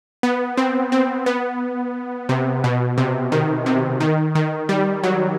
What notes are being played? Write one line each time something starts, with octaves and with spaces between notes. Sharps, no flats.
B3
C4
C4
B3
C3
B2
C3
D#3
C3
D#3
D#3
G3
F#3